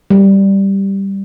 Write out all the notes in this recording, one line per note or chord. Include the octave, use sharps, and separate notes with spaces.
G3